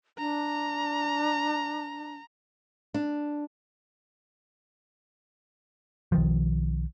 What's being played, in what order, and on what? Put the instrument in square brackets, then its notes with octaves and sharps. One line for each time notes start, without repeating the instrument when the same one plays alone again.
[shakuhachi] D4 [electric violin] A#5
[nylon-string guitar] D4
[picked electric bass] B1 D#3 F3